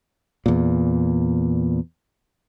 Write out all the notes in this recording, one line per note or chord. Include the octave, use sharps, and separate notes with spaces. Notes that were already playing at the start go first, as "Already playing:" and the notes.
E2 A#2